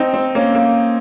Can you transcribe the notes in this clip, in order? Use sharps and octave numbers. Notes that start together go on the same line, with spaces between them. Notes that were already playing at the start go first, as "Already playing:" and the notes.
Already playing: C4 D#4
C4
A#3 C#4
A#3